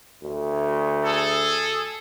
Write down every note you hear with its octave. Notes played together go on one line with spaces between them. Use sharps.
D2
G#4 A4